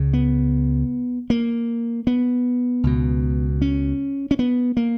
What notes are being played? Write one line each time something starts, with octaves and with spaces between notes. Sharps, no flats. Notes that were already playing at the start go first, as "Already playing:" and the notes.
Already playing: C#2 C#3
B3
A#3
B3
C#2 B2
C#4
C#4
B3
A#3